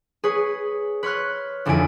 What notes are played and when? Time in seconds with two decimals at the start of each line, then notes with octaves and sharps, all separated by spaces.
0.24 G#4 B4 C#5
1.03 B4 C#5 C6 F6 F#6
1.65 D#1 F2 D3 E4 G#5 D7